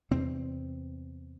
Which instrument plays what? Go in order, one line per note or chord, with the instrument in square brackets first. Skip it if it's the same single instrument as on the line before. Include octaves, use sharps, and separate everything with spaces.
[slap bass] E2 C3 C4